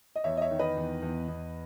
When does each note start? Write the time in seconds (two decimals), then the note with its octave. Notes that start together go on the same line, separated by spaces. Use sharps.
0.16 D#5
0.24 E2 C#5 E5
0.37 D#5
0.41 C#5 E5
0.51 D#3
0.59 B4 D#5
0.77 E2
1.02 E2
1.28 E2